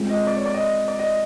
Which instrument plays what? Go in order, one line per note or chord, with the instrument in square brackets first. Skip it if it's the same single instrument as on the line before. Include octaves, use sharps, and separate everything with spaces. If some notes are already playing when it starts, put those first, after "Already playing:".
Already playing: [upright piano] G#3 C4 F4
[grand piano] D#5
D5
C#5
D5
D#5
D5
D#5